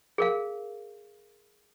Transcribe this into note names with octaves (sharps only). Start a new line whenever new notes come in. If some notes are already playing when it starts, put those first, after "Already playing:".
G#4 A#4 F5